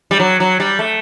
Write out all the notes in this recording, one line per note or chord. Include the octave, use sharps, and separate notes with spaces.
G3
F#3
F#3
G3
A3